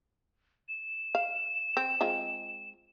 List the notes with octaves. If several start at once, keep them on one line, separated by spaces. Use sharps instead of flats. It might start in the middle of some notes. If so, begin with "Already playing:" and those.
E7
F5
C4
G#3 C4 F4